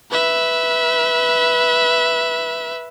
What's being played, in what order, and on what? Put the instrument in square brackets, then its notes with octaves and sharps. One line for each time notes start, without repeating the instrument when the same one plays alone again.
[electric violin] B4 E5